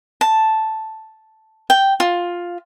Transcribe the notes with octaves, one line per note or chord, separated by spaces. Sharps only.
A5
G5
F4